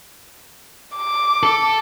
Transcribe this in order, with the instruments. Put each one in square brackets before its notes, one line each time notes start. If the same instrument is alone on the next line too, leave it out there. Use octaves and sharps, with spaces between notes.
[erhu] D6
[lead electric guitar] A4